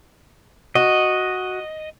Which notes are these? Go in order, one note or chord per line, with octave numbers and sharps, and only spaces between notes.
F#4 D#5